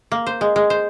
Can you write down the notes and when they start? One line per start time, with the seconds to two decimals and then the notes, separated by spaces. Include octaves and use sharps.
0.12 A#3
0.27 C5
0.41 G#3
0.56 G#3
0.70 C5